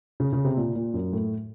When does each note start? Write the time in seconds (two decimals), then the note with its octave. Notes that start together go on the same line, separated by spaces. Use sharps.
0.20 C#3
0.33 C#3
0.44 C3
0.57 A#2
0.75 A#2
0.94 F#2
1.13 A2